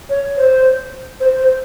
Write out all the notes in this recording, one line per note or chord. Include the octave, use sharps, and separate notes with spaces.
C#5
C5
C5
C5